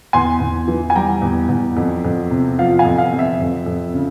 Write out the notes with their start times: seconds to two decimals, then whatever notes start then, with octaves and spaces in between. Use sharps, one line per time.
0.13 E2 G#5 C6
0.40 E2
0.68 E3
0.90 G#5
0.95 G3 G5 A#5
1.22 E2
1.49 E2
1.77 F2
2.05 F2
2.31 C3
2.59 F3 F5
2.79 F5 G#5
2.85 F2
2.98 F5
3.13 F2
3.19 E5
3.40 F2
3.66 F2
3.94 C#3